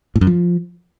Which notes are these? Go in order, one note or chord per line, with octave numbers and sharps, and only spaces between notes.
A2
F#2
F3